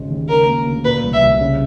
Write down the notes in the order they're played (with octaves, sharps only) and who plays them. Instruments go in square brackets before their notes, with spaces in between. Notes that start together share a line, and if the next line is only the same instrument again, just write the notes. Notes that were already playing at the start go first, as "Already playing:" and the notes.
Already playing: [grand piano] G#1 C#3 G#3
D#2
[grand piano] C#3 [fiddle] A#4
[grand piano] A#3
D2
[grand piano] A#2 [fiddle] B4
[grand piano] C2
[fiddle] E5
[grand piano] C2
C#3